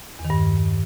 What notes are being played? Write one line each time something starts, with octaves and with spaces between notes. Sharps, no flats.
E2
D#3
G2